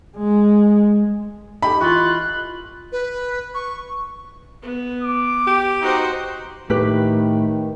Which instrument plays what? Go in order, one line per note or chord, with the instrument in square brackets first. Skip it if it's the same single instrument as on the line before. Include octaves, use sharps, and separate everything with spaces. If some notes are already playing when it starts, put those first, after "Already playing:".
[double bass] G#3
[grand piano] D#4 G4 A4 [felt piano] B5
[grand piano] E3 D#5 C#6 [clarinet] F4 [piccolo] F#6
[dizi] B4
C#6
[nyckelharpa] B3
[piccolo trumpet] D6
[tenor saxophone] G4
[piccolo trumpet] D#4 [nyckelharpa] F#4 C5
[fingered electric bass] A2 [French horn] D#3 [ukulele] G4 B4